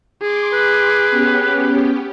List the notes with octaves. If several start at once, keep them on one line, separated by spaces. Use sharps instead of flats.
G#4 C6 D6
B4
B3 C#4 G4